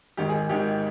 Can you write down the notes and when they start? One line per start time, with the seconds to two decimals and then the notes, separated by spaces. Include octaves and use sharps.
0.17 G#1 G#2 D#3 G4
0.29 G#4
0.39 G#4
0.50 G#1 G#2 D#3 G4